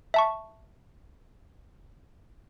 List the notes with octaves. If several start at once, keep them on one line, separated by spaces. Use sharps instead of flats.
E5 A5 C#6